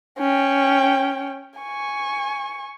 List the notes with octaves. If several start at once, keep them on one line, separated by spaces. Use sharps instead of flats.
C#4 G5
G#5 C#6